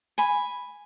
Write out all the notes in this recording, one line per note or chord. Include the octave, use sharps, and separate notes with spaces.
G#5 B5